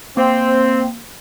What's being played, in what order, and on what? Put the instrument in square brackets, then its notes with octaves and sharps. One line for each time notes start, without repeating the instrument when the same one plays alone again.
[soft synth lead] A#3 [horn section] C4